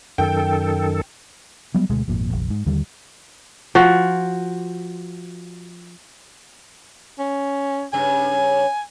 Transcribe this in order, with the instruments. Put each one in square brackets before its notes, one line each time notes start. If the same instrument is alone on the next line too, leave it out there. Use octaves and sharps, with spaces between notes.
[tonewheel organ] F#2 D#3 A4 [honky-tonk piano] G5
[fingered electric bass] F#3 G3 B3
D2 B2 G#3
G#1 F2 A#2
F1 A#1
G#2
D#2 D3 D#3 G3
[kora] F3 F#4
[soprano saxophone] C#4
[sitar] G2 C#3 [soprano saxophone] G#5